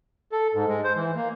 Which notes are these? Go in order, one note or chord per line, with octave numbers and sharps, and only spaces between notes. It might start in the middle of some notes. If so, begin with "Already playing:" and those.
A4
G#2
G#3
C5
E3
A#3